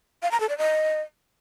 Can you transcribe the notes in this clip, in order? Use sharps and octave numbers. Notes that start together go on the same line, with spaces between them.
F5
A#5
A4
D5
D#5